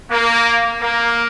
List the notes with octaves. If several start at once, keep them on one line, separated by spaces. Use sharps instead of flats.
A#3
A#3